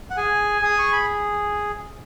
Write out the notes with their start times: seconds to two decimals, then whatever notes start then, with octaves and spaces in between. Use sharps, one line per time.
0.10 F#5
0.17 G#4 G#5
0.62 G#4 D#6
0.78 C#6
0.93 B5